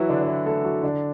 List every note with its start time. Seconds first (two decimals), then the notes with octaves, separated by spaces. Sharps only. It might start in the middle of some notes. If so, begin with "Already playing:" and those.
Already playing: E3 F#3 E4 F#4
0.09 D3 D4
0.21 D4
0.28 E3 E4
0.46 A3 A4
0.64 F#3 F#4
0.83 D3 D4